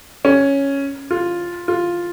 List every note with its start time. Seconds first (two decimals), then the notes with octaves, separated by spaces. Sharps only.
0.25 C#4
1.11 F4
1.68 F4